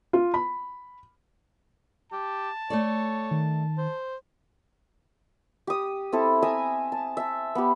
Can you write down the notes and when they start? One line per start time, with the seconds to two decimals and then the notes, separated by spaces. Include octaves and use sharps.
0.13 F4
0.34 B5
2.12 G4 A5
2.70 A3 A4 C#5 D5
3.31 D#3
3.78 C5
5.67 G4 D#6
6.12 C4 E4 A4
6.42 E5 G#5 A#5 D#6
6.92 A5
7.17 E5 A5
7.55 B3 G4